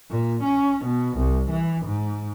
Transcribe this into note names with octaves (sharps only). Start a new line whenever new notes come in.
A#2
C#4
B2
C2
E3
G#2